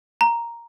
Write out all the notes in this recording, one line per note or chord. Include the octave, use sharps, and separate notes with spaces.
A#5